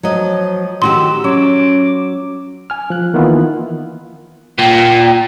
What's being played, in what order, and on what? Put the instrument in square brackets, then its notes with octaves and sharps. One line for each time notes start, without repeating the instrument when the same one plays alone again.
[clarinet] F3 [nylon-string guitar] F#3 D#5
[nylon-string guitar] D#3 F#4 G4 [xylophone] C6 [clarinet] E6
[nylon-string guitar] F#3 [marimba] C#4 [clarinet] D6
[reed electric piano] G#5 F6
F3 F#6
D#3 E3 A#3 B3 E4 F4
[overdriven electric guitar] A#2 [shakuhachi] G5